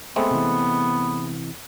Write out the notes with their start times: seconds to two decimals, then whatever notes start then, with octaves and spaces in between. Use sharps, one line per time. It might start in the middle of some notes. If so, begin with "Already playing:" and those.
0.16 G#3 A3 B3 C4
0.31 C3 E3